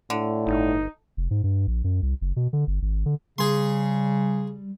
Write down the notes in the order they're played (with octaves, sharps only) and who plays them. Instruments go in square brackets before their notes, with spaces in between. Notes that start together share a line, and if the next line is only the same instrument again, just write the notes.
[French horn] A2 [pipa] D3
[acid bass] G1 [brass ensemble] D#4
[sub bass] F1
G#2
G2
A#1
F#2
C2
F#1
B2
D3
G1
G#1
D3
[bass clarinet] C#3 [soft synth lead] G3 [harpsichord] G#4 C6